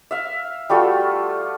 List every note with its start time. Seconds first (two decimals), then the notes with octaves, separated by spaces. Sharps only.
0.11 E5 F5
0.69 G3 A3 F4 F#4